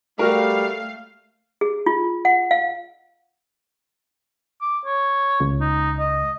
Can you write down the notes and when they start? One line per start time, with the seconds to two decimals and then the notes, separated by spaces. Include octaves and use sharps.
0.19 G3 A3 F#4 A#4 F5
1.61 G#4
1.86 F4
2.25 F#5
2.51 F5
4.61 D6
4.86 C#5
5.40 C#2
5.60 D#4
5.99 D#5